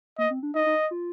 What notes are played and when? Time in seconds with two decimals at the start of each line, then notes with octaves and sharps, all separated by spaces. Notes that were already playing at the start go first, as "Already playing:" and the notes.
0.18 A#3 D#5
0.31 C4
0.43 D4
0.55 D#4 D#5
0.66 D#4
0.91 F4